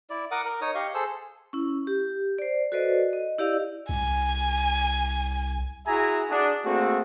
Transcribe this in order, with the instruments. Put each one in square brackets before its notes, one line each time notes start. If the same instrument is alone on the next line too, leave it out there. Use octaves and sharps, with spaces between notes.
[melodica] E4 D5
A#4 F#5 D6 D#6
A#4
D#4 C#5 D#6
G4 D#5 F5 C#6
G#4 A4 C5 E6
[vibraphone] C#4 E4
G4
C5 D5
F#4 A4 B4 C5 D5 D#5
D#5
E4 G4 D5 D#5 F5 E6
[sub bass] C2 [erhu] G#5
[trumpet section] E4 F#4 G#4 E5 G#5 A#5
D4 F#4 G#4
A3 A#3 C4 F#4 G#4 A4